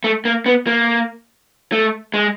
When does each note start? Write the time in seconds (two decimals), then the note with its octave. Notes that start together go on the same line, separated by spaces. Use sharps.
0.04 A3
0.25 A#3
0.46 B3
0.67 A#3
1.72 A3
2.14 G#3